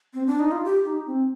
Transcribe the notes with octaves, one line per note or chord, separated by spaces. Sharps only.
C4
D4
D#4
F4
G4
D#4
C4